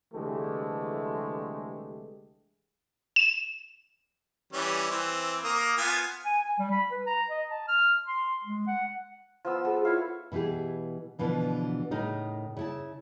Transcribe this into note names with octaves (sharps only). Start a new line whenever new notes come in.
C2 D3 E3 G#3 A3 G4
E7
E3 G3 C#4
E3 C4
A#3 D#6
B3 F4 G#5
G#5
G#5
G3
B5
B4
A#5
D#5
A5
F6
C6
G#3
F#5
F3 B3 E6
G#4 A4 B4
E4 F4 C#5 F5
B2 E3 E4 G4 G#4
B2 D3 E3 F3
A2 C#3 D#4 A#4
C#3 E4 A5